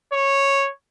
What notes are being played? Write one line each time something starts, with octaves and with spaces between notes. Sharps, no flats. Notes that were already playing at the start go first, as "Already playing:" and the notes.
C#5